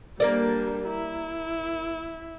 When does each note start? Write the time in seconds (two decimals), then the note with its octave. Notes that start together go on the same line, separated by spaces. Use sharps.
0.20 G3 A#3 D4 A#4 D5
0.88 E4